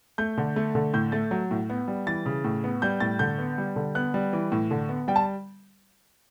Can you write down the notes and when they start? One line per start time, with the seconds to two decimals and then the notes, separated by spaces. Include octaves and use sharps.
0.18 A3 G6
0.38 D3
0.56 A3
0.75 D3
0.94 A2 G6
1.12 A3 A6
1.31 F#3
1.51 A2
1.70 B3
1.88 G3
2.07 E3 A6
2.26 C#3
2.44 A2
2.64 B3
2.82 G3 G6
3.00 A2 A6
3.19 D3 G6
3.38 B3
3.58 G3
3.76 D3
3.95 B3 F#6
4.14 G3
4.33 E3
4.52 A2
4.71 D3
4.89 B3
5.08 G3 G5
5.16 A5